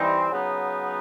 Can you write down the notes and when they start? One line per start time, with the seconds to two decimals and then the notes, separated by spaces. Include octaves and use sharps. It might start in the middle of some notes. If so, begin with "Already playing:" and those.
Already playing: E3 G3 C4 D#4
0.31 C#3 F#3 B3 D#4